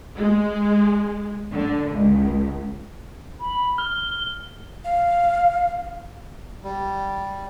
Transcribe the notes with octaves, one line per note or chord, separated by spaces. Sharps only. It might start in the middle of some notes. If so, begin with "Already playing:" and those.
G#3
D3
C#2
B5
F6 G7
F5
G3